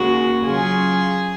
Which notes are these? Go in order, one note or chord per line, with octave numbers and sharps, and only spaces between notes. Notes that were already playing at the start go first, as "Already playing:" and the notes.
Already playing: D#2 C#3 G#3 F#4
C#3 F#3 C#4 F4 G#4